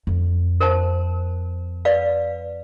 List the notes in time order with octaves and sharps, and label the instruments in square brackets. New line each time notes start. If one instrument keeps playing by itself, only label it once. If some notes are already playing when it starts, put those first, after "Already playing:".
[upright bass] F2
[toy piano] A#4 C5 A5
B4 D5 F5